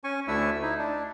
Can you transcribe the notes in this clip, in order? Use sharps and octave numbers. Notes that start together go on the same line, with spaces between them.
C#4 G#5 C#6
D2 A3 D4 E4 E5 E6
D#4 E4
D4